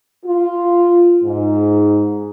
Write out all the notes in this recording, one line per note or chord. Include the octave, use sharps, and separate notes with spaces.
F4
G#2